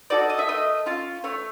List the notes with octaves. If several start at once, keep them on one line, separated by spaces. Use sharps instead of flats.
D#4 F#4 A4 D5
D#5
E5
A3 D#5
C#4 F4
A3 C#5